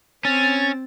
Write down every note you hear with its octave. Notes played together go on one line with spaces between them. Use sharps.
C4 C#4 A6